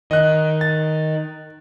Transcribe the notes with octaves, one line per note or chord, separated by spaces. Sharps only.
D#3 D#5 F#6
A6